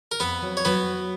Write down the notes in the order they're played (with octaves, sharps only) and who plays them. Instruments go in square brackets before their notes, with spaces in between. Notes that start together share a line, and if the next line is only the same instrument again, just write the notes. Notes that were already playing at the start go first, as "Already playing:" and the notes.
[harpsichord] A#4
[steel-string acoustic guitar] F2 [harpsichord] B3 B4
[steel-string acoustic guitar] F#3
[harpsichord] C#5
[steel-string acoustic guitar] F#3 [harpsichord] B3 B4